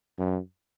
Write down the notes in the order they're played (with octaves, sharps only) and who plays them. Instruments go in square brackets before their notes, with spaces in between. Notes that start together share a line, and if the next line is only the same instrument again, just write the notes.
[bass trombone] F#2